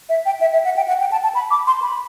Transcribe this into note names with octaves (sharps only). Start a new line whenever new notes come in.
E5
G5
E5
E5
F#5
G5
F#5
G5
A5
A5
B5
D6
C6
B5